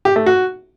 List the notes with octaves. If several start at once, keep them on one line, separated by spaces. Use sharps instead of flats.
G4
A3
F#4